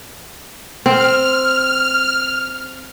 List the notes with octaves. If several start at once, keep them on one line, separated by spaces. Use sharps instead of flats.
C4 F6